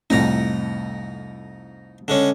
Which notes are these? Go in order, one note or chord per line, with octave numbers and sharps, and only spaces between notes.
C2 F2 A2 D#4 A#5
D3 G#3 C#4